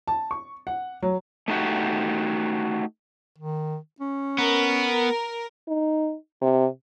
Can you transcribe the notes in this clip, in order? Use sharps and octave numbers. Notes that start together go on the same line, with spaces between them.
A5
C#6
F#5
F#3
A3 D#4 F#4 G4
D#3
C#4
B3 A#4
D#4
C3